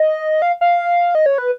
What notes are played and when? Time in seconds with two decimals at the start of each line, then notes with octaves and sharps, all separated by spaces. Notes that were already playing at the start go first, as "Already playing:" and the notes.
Already playing: D#5
0.42 F5
0.61 F5
1.15 D#5
1.26 C#5
1.38 B4